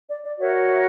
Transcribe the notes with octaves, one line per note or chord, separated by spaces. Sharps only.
D5
D5
F#4 A#4 C#5 E5
E5